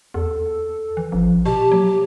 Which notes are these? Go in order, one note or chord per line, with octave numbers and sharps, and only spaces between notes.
E2 A4
E3
A1 F3
B2 G4 A5
F#3 A#3